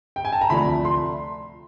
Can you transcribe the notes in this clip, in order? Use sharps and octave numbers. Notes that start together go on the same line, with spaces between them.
G5
G#5
A5
A#5
D2 C3 F3 A3 D4 B5
C6